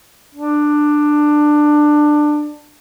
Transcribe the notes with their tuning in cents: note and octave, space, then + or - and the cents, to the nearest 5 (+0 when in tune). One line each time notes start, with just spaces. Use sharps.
D4 +15